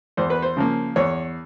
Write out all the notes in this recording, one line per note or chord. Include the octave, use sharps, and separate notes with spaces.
E2 C5
B4
C5
C#3 F3 A#3
E2 C#5